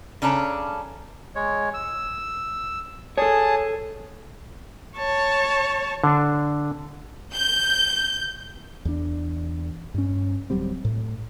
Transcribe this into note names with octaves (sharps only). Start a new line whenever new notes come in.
C#3 C#4 D4 A4 A#5
G#3 C#5
E6
G#4 A4 C#5 A5 D#6
C#5 A5
D3 D4
G6
E2 D4
G2 C#4
D1 F#3 G3 C4
A2